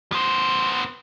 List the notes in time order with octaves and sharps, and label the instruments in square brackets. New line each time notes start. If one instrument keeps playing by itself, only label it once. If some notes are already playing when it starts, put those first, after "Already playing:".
[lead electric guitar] B3 C5